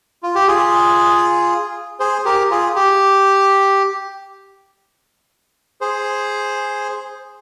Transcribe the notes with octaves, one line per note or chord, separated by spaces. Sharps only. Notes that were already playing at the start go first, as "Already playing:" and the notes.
F4
G4
F4 G#4
G#4 C5
G4 A#4
F4 G#4
G4
G#4 C5